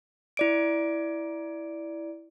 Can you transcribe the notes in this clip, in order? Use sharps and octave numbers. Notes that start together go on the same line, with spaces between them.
E4 D5 D7